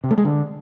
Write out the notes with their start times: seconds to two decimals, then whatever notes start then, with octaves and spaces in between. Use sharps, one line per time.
0.04 C3
0.11 A3
0.18 G#3
0.25 D3